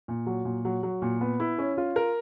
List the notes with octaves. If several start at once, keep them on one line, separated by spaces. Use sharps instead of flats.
A#2
F#3
A#2
F#3
F#3
A#2
B3
E4
C#4
F4
A#4